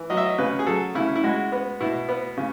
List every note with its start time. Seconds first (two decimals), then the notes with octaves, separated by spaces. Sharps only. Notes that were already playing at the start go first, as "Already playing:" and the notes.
Already playing: E3
0.10 F#3 D#5
0.17 E5
0.25 D#5
0.38 C#3 B4
0.59 G#4
0.67 F#3 A4
0.95 C#3 E4
1.16 E4
1.24 G#3 F#4
1.52 B3
1.80 B2 E4
2.09 B3
2.37 C#3